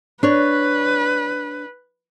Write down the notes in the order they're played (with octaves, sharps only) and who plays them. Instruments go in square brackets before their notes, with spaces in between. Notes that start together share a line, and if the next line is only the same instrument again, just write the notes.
[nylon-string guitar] D4 C#5 [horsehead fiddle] B4